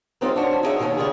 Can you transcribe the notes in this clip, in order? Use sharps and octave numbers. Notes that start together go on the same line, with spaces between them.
F#3 G#3 C4 C#4 D#4 F4
D4 F#4 C5 C#5
D#4 E4 G4 G#4 C#5 E5
B2 D#3 G3 A#3 C#4
C#3 F3 D4 F4 G4 G#4